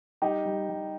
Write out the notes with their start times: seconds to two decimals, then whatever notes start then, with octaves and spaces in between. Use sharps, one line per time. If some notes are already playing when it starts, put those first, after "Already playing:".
0.22 G3 D#4 G4
0.45 G3
0.69 G3